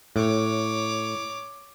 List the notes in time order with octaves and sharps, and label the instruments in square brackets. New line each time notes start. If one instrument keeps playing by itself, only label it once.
[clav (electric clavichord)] A2 [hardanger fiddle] C#5 D6